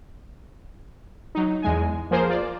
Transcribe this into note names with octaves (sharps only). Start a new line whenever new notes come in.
F#3 D#4
E2 G#3 G#5
F3 A#3 G#4 A#4 C5
F4 D5